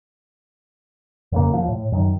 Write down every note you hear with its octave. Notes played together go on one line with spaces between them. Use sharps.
F2 C#3 A#3
D#2 F3
A2
F#2 D#3